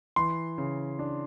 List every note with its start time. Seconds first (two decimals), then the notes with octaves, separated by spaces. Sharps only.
0.16 E3 C6
0.58 C#3
0.99 D4